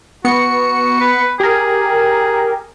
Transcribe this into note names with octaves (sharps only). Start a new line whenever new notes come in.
B3 F#4 C#7
B4
G4 G#4 A#4